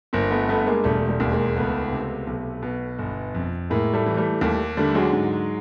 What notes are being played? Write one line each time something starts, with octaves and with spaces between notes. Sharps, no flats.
G1 A#3 C4
A3 B3
G2 A3 B3
G#3 A#3
E1 G3 A3
G3 A3
D#2
G#3 A#3
C#2 A3 B3
C3
B1
B2
G1
F2
A2 G#3 A#3
G3 A3
E3
G3 A3
D#2 G3 A3
D3 G3 A3
F#3 G#3
G#2